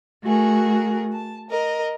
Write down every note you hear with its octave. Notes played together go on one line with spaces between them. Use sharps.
A3 F#4 G#4 A#4
A5
A#4 D#5